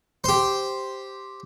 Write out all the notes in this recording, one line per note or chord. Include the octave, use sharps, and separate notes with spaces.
G4 C5